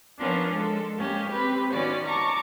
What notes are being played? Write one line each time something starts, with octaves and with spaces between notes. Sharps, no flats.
F3 B3 C#4 D4 F4 A#4
G#3 A4
G#3 A#3 C#4 G4
C4 G4 B4
D#3 B3 C#4 F4 F#4 D5
A5 A#5 C#6 D6